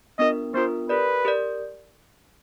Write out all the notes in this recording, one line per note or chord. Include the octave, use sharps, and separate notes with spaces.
B3 D4 F4 A#4 D#5
B3 D4 F4 A#4 C5
G4 A#4 B4 D5
G4 A#4 D5